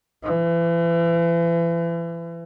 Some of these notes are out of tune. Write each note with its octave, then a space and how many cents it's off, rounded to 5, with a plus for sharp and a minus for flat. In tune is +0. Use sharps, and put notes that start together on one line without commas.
E3 +35